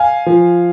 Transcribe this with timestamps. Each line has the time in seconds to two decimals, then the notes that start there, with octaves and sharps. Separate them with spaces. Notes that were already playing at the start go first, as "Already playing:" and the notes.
Already playing: F5 G#5
0.26 F3